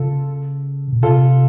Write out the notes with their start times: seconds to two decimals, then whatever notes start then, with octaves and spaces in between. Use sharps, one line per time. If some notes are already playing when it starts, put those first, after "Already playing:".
Already playing: C#3 F4 A4
0.93 A#2
1.02 C3 F4 A4